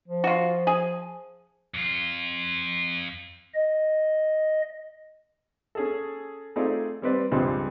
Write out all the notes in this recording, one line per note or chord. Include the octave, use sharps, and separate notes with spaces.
F3
F4 F#4
G#4
F2 F4
D#5
C#4 G#4 A4
A3 C4 D#4 F4 G#4 D5
G3 C4 B4 D5
C#2 G2 F3 G3 G#3 C4